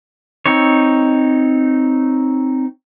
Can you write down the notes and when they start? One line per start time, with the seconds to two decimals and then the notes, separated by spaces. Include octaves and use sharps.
0.46 C4 D#4 C#5